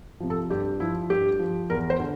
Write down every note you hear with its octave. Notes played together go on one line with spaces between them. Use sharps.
C3 F3
A4
G2 G4
F3 E4
G2 G4
F3
E2 A#4
C5
D3